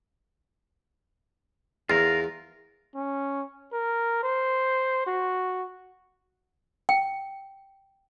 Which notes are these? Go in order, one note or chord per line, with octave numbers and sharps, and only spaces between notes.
E2 F4 A#4
C#4
A#4
C5
F#4
G5